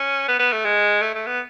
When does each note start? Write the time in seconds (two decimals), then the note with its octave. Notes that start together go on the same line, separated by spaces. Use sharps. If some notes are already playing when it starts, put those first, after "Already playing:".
Already playing: C#4
0.28 B3
0.39 B3
0.52 A3
0.65 G#3
1.02 A3
1.15 A3
1.27 B3